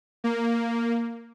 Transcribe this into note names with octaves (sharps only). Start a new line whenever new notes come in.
A#3